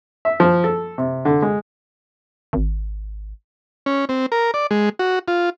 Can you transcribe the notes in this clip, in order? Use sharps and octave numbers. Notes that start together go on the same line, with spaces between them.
E5
F3
A4
C3
D3
G#3
G#1
C#4
C4
A#4
D5
G#3
F#4
F4